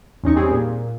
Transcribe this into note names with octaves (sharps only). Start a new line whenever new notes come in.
E2 C#4 D#4 C#6
G3 C4 G#4
A#2